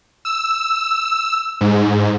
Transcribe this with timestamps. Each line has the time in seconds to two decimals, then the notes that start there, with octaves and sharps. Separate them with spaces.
0.25 E6
1.61 G#2